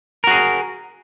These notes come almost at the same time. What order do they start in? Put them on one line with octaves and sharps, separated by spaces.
A#4 F#4 G#4